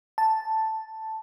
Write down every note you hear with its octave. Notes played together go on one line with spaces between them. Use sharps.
A5